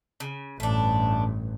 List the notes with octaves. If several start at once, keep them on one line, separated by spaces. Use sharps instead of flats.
C#3
A1 G2 A3 D4